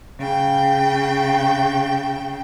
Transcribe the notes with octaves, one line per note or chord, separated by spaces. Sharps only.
C#3 G5